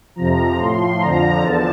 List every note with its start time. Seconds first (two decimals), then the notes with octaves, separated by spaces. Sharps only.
0.16 F2 C3 F3 A#5
0.57 A2 F3 C6
0.99 F2 D3 F3 A#5
1.42 E2 D3 F3 A5